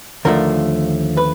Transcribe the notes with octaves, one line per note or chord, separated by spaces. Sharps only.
D#2 D3 F3 A3 A#4
B4